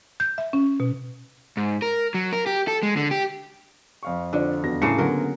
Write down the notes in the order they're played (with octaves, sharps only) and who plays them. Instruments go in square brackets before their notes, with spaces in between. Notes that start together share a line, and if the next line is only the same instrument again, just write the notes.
[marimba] G6
E5
C#4
B2
[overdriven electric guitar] G#2
A#4
F#3
A#4
G4
A4
G#3
D3
G4
[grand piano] F2 F5 C#6
[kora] D3 [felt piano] F4 C5 D5
[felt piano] E2 F#4 A#6
[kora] A2 C#3 A#3 [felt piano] C7 C#7
[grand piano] D3 B3 [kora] F#3 A#4